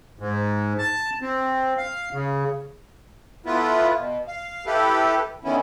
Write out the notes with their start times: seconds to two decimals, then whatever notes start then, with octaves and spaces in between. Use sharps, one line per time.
0.19 G#2
0.78 A5
1.22 C4
1.77 F5
2.12 C#3
3.46 A3 B3 E4 F4 B4
3.97 B2
4.28 F5
4.66 E4 G4 A4 B4
5.44 D3 D#3 B3 C#4 E4